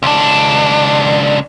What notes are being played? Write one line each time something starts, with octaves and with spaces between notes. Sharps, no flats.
C#2 D4